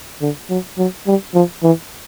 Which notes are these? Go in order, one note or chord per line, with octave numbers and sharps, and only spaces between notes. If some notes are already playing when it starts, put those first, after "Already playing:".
D3
F#3
F#3
G3
F3
E3